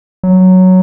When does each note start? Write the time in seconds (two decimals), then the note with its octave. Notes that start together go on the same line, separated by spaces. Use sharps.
0.23 F#3